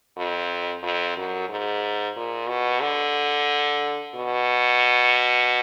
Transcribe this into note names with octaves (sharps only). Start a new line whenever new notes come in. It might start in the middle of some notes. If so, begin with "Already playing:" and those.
F2
F2
F#2
G#2
A#2
B2
D3
B2